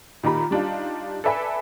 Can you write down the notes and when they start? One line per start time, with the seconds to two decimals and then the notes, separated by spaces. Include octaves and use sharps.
0.23 A#2 D#3 G4 A#5 B5
0.51 G3 D4 D#4 F4
1.24 A4 B4 D5 E5 G#5 B5